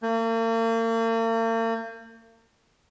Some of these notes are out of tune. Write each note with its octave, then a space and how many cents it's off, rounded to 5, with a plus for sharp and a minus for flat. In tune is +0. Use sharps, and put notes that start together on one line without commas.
A#3 -45